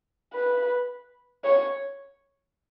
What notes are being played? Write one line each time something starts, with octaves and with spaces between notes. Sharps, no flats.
B4
C#5